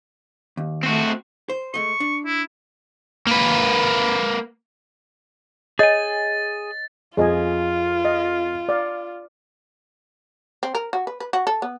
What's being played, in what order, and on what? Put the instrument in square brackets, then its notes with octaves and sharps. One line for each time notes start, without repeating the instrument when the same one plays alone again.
[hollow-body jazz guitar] D#2
[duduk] A3 [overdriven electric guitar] C4 F#4
[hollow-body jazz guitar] C5
[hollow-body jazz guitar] G#3 A3 D#5 [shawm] C#6
[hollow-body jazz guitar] D4
[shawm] E4
[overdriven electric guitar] A#3 B4
[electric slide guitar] G#4 G#5 [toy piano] C#5 D#5 [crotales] A6
[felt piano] F2 [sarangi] F4 [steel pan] G#4 D#5 G#5
[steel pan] D#5
D5 F5
[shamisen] C4
A#4
F#4
B4
B4
F#4
A4
B3